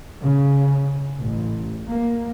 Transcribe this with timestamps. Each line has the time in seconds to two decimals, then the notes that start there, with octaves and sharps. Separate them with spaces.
0.22 C#3
1.19 A1
1.88 A#3